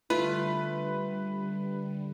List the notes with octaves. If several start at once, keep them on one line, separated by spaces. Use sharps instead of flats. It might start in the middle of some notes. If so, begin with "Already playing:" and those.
D3 G3 A3 F4 B4